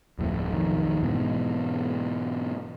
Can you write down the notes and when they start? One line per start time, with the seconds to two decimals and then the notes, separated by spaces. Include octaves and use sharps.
0.19 D1 F2 A2
0.52 B1 F2 D#3
1.03 G#2 B2 E3